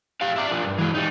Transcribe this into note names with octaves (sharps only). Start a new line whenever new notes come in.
G4 F5
E4 D5
F3 D4
G2
E3 G#3
G3 D#4